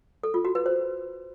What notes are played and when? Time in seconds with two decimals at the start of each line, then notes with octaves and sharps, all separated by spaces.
0.23 A4
0.34 F4
0.45 F#4
0.55 B4
0.66 C5